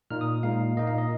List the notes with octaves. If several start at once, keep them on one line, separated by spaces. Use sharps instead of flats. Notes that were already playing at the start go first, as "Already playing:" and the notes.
A#2 A#3 D#4 F6
D#6
A#2 G#3 D#4 F5
A#2 A#3 D#4 D#5
F5
D#5